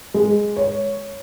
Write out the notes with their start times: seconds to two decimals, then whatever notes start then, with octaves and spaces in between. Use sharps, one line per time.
0.14 G#3
0.57 C#5